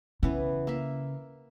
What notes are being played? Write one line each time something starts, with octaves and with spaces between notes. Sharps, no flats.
C#3 E3 B3
A#3 E5